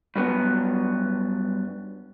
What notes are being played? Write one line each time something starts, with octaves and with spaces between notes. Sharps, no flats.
G2 F#3 B3